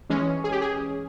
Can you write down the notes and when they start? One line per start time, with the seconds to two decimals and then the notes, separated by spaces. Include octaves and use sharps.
0.09 E3 G#3 C#4
0.44 G#4
0.52 G4
0.61 G#4